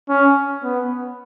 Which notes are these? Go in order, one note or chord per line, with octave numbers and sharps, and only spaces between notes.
C#4
B3